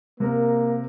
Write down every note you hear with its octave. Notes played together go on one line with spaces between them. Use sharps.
C3 A#3 A#4